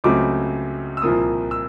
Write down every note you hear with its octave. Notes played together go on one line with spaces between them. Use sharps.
C#2 C#3 F#3 A3 C4 D6
E6
C2 A#2 F3 A#3 D#6
E6